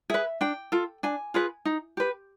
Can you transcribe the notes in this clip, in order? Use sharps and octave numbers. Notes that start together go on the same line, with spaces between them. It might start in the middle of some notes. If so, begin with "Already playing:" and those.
G#4 B4 E5
D4 G5
F4 A4
D4 G#5
F4 G#4 B4
D#4
G4 B4